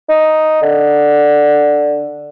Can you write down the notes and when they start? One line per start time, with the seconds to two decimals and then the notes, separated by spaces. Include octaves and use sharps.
0.09 D#4
0.62 D3